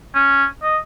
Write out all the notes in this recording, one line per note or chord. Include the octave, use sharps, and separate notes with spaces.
C#4
D#5